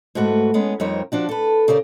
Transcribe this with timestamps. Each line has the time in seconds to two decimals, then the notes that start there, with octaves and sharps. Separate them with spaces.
0.15 G#2 A3 F#4 B4
0.54 G#3 B3 C#4
0.80 F2 G3 C4 D#4 A#4 C#5
1.12 F3 D4 F#4
1.29 A4 B4
1.68 C#3 G4 A#4 B4 D5